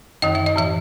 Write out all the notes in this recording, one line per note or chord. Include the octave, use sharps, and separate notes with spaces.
F#2 D#3 D#5
E5
D#5
A2 E3 E5